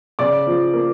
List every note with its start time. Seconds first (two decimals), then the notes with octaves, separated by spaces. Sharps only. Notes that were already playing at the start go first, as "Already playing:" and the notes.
0.19 C#3 D5 D6
0.47 F3
0.74 A#3